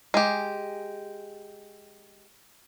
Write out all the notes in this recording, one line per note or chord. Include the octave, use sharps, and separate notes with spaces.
G#3 G4